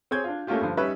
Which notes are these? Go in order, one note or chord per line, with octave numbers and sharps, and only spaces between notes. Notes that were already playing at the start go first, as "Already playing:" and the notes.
C4 G#4 C#5 G6 G#6
D4 F4
A3 A#3 C#4 F4 G4
G2 D3 F3 D4
G3 C#4 D#4 B4 C#5 E5